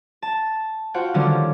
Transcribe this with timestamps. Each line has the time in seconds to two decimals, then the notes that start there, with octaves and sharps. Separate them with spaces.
0.22 A5
0.94 F4 F#4 C5 F#5 G5
1.14 D3 D#3 F3 G3 C#4 D4